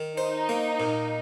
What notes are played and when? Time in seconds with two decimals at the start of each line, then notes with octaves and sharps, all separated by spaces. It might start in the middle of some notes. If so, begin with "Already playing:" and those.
Already playing: D#3
0.17 D#4 C5
0.49 A#3
0.80 A#2